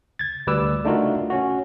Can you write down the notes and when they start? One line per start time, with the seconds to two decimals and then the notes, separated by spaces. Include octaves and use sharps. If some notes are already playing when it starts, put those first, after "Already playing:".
0.19 G#6 A6
0.47 D2 G3 B4 D6 E6
0.85 A3 D4 D#4 F4 F#4 A#4
1.30 C#4 F#4